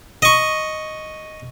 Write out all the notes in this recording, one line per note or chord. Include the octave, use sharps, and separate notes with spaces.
D#5 C#6